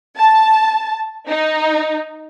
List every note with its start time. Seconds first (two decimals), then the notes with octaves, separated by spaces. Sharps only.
0.17 A5
1.29 D#4